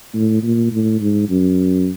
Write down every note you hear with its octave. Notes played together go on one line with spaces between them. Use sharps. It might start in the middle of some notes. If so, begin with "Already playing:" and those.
A2
A#2
A2
G#2
F#2